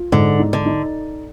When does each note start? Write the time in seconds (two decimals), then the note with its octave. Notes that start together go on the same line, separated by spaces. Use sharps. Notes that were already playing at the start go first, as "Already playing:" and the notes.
Already playing: F4
0.12 G#2 D3
0.39 D#4
0.53 D3
0.66 D#4